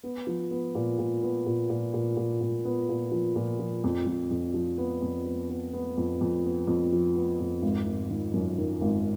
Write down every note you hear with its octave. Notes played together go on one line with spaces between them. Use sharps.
B3
F3
B3
A#2
A#2
B3
A#2
A#2
A#2
A#2
A#2
B3
A#2
F3
A#2
F3
F2
F2
F2
F3
B3
F2
B3
B3
B3
F2
F2
B3
F2
F3
B3
F2
G#1
G#1
D#3
F#2
D#3
G#1